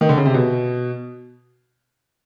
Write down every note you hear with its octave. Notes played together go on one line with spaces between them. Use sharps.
D#3
D3
C#3
C3
B2